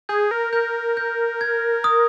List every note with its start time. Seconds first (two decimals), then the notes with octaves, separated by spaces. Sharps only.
0.09 G#4 G6
0.31 A#4
0.53 A#4 G6
0.97 G6
1.41 G#6
1.84 D#6